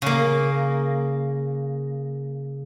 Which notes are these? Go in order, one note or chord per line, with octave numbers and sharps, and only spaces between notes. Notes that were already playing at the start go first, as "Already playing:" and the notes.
C#3 A#3